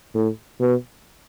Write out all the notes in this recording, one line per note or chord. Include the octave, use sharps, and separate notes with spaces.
A2
B2